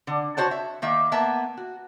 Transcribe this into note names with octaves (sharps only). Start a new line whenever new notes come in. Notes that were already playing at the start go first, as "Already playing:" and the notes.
D3
F#4 C5 C#5 A5
E5
D#3 A#3 E5
A#3 B3 E5 A5
F#4